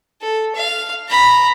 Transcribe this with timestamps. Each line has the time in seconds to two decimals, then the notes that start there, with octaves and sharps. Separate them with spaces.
0.21 A4
0.55 F5
1.09 A#5 B5